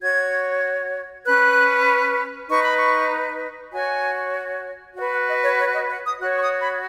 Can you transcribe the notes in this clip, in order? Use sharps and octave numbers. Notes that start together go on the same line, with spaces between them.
F#4 C#5 G#6
C#4 B4 F#6
D#4 B4 C#6
B5
C#6
F#4 C#5 G#5
F#4 B4 F#5
F#5
D#5
C#5
C#5
D#5
F#5
D#6
F#4 C#5 F#6
C#6
D#6
B5